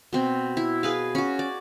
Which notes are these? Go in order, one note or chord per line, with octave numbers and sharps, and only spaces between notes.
B2 C4
E4
G#4 B4 F5
C#4 F#4
D5